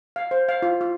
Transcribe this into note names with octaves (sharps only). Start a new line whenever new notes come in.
F5
C5
F5
F4
F4